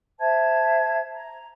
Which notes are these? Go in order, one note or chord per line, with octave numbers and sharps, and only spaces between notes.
C5 E5 A5 G#6
A#5